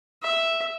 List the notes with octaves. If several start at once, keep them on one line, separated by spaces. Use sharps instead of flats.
E5